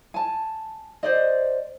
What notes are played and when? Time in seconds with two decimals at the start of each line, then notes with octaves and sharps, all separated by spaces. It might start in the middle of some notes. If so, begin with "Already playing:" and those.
0.14 G#5 A5
1.03 C5 D5 D#5